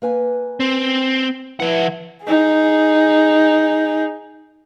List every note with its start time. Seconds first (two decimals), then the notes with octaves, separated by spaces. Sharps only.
0.02 A#3 B4 G#5
0.60 C4
1.60 F3 E4 B4 E5 F#5
2.25 D#4 G#4